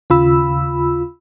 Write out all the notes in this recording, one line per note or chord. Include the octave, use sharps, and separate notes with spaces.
D#2 C#3 F4 B5 E6